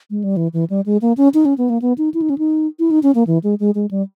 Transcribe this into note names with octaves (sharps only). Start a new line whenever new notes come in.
G#3
G3
E3
E3
G3
G#3
A#3
C#4
D#4
C#4
B3
A#3
B3
D#4
E4
D#4
C#4
D#4
E4
D#4
C#4
A#3
E3
G#3
G#3
G#3
G3